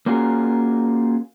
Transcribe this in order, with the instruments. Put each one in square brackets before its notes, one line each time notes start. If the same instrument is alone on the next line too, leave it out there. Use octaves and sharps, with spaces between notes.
[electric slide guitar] A#3 C#4 F4 F#4 G#4 A#4